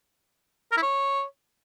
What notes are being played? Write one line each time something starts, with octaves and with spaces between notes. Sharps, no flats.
A#4
E4
C#5